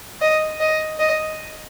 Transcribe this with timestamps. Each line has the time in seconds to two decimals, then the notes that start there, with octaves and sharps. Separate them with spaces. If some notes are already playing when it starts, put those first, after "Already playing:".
0.21 D#5
0.60 D#5
0.99 D#5